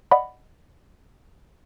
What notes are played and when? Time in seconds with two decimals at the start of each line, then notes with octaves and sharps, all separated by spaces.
0.11 D5 D#5 F#5 B5